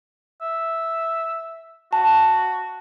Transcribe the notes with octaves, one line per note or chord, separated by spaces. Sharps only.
E5
F#4 A5